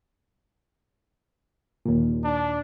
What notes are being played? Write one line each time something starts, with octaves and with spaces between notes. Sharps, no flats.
D#2 A#2
D4